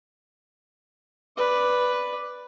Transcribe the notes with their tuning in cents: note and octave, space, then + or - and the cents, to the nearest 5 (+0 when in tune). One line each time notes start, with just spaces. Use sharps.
B4 +0 D5 +0